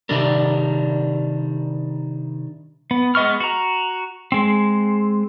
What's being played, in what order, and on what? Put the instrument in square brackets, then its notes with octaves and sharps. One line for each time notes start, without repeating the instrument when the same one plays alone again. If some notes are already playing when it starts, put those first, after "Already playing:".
[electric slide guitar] C3 D#3 G3 D4 A#4
[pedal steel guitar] B3
G#3 B3 D#5 C#6 F6
F#4 A#5
G#3 C4